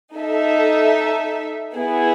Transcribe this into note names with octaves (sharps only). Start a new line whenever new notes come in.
D#4 A4 E5
B3 E4 G#4